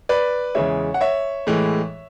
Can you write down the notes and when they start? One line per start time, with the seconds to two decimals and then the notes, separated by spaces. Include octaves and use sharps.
0.09 B4 D5
0.55 E2 C#3 G#3 C#5 E5
0.94 F#5
1.01 C#5 E5
1.47 A2 E3 G#3